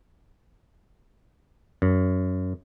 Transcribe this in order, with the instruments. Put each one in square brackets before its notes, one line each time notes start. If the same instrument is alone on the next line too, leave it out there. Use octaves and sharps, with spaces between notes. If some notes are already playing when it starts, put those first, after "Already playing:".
[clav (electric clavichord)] F#2